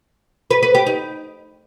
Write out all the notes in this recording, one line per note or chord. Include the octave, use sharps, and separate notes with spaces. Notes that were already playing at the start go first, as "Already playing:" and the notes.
B4
B4
G4
D#4